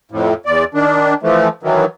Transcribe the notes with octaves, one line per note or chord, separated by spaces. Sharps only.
F2 A2
E2 D5
D#3 D4
E3 F3 A3
D#3 E3 F#3